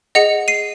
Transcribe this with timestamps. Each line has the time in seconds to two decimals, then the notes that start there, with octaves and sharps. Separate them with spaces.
0.15 G#4 D#5 F#5 C#7 F7
0.48 C7 D#7